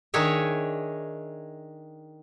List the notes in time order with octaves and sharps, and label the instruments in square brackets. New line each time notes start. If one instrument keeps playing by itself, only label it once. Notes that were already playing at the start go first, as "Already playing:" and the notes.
[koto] D#3 D4 G#4 C#5 E5